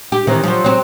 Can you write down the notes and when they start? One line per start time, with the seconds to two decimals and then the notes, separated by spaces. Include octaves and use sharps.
0.12 G4
0.27 D#3 E3 C4
0.43 F3 F#3
0.64 F#3 C4